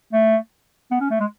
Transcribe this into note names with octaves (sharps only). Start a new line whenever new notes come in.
A3
B3
C#4
A3
G#3